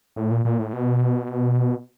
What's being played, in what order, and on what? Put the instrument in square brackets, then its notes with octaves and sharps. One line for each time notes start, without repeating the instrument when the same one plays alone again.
[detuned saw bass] A2
A#2
A#2
A2
B2